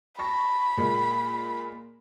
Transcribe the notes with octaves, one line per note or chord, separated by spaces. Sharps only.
A5 B5 C#6 A#6
A#2 G#3 A#3